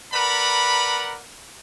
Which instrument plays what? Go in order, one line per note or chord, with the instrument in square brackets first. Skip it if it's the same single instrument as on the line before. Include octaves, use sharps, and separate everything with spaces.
[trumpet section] A#4 B4 D5 F#5 A#5 B5